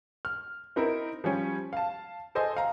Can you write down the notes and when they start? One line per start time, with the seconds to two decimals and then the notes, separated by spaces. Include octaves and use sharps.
0.25 F6
0.76 C4 D#4 E4 A#4
1.24 F3 G3 C#4
1.73 F5 A5
2.35 A4 C5 D#5 G#5
2.57 F5 A#5